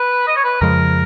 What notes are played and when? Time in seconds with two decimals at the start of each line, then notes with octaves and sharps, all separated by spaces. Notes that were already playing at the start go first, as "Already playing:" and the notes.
Already playing: B4
0.27 D#5
0.36 C#5
0.44 B4
0.61 F2 C#3 F3 G#3 A#4